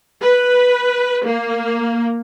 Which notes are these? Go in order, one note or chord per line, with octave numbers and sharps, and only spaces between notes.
B4
A#3